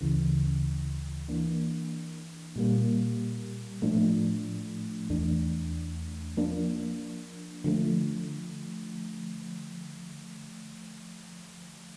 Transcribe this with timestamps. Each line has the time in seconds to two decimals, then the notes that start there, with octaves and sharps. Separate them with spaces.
0.01 D2 C#3 E3
1.28 E3 A#3 D4
2.56 A#2 G3 A#3
3.82 A2 F3 A3 D4
5.10 E2 E3 A3 D4
6.37 F3 A#3 D4
7.64 D3 F3 A3